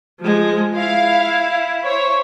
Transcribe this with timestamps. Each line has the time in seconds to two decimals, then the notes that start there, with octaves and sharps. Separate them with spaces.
0.21 F3 G#3
0.75 E4 F5
1.83 C5 C#5